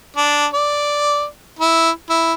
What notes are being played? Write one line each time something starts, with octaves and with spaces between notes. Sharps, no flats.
D4
D5
E4
E4